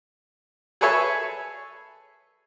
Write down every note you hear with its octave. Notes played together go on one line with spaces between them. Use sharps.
G#4 A4 B4 C#5 E5 G#5